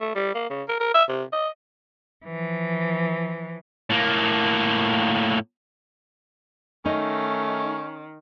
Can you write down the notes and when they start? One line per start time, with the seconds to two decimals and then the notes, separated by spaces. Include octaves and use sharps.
0.01 A3
0.15 G3
0.35 A#3
0.50 C#3
0.68 A#4
0.80 A#4
0.94 E5
1.09 C3
1.33 D#5
2.25 E3 F3
3.90 A2 A#3
6.85 D#3 A3 C#4 D#4